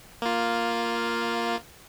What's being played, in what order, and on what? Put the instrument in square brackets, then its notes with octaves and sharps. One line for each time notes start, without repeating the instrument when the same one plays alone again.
[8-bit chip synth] A#3 F4